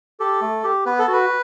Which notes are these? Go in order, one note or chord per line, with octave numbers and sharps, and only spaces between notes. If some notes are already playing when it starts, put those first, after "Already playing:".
G4 A4
A3
G4
B3 B4
A4
F#4 B4